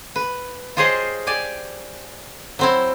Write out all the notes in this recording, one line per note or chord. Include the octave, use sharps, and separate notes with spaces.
B4
F4 G4 G#4 C5 C#5 D#5
G4 D5 G#5
F#3 C4 E4